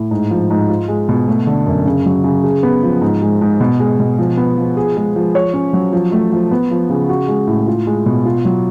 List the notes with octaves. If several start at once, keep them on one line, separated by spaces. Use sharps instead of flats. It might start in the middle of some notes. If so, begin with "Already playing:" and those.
Already playing: A2
G#2
F3
G#2
F4
G#3
B2
A3
D3
F#2
C#3
F#3
C#3
G#4
B3
F3
G#2
G#3
G#2
B2
G#3
B2
F3
B3
F3
G#4
G#3
F3
C#5
C#4
F#3
F3
A3
F3
B3
F3
C#3
F#4
G#3
A2
F4
G#3
B2
F4
F#3